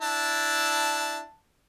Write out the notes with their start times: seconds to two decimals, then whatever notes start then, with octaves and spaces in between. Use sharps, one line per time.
0.02 D4 E4 A5